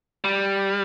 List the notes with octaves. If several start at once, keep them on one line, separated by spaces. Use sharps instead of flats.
G3